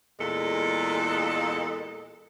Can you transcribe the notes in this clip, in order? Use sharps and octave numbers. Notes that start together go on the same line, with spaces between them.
E2 A#2 G#3 A4